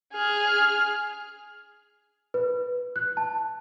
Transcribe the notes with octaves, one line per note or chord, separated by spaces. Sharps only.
G#4 F6
B4
F#6
A5